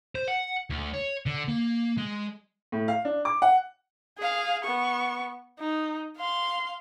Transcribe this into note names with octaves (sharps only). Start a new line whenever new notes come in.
C5
F#5
D2
C#5
D3
A#3
G#3
A2
F5
D4
D6
F#5
G#4 F5
B3 C#6
D#4
F5 C6